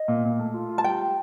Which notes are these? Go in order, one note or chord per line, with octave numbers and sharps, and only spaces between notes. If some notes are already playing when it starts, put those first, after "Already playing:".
Already playing: D#5
A#2
A#2
A3
F4
F4
A5
G3 G5